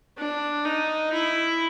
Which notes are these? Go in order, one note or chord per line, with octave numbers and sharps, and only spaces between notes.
D4
D#4
E4